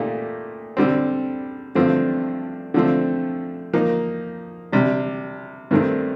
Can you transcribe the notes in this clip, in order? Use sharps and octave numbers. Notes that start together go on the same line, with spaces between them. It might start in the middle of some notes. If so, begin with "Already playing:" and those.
Already playing: A#2 A3 D#4 G4
D3 G3 C4
G2 D3 F3 A3 C4
D3 F3 A3 C4
F3 A#3 D#4
C3 G3 D4
G2 D#3 A3 C4